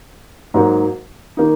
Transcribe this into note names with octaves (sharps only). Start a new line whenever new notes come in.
G#2 F#3 A#3
D#3 A#3 D#4